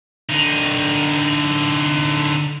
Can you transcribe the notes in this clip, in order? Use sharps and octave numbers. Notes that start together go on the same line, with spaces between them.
D3 D#4